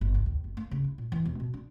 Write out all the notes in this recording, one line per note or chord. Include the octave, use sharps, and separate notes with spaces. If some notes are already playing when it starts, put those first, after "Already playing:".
G1
C2
D#2
G1
A#3
C#3
E4
A#2
E3
E1
B2
D4